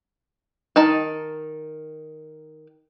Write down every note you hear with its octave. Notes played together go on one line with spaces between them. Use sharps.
D#3 D#4 A5